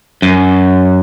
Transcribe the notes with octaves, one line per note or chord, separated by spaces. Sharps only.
F#2